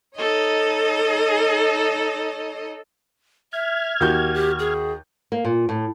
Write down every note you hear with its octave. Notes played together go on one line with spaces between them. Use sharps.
D#4 A4 C#5 D#5
E5 F6 G#6
D#2 F#4 G4 G6
G4
G#4
A#3
A#2
A2